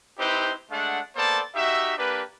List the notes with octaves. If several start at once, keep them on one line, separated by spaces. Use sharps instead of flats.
C4 D#4 E4 G4 B4 C5
G#3 A3 D4 F#5
A#3 B3 A4 C5 D5 A5
D#4 F#4 G4 E5
A#3 D4 G4 B4